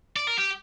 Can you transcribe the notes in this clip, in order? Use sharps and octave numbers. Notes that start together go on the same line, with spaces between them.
D5
A#4
G4